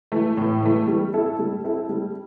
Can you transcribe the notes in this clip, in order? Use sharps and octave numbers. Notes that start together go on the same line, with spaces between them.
E3 A3
A2
E3 A3
G3
C4 E4 A4
G3
C4 E4 A4
G3